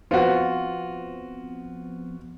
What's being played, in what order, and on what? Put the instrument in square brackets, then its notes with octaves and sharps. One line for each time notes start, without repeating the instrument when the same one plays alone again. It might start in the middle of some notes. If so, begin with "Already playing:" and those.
[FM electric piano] F3 B3 C4 [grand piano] F4 F#4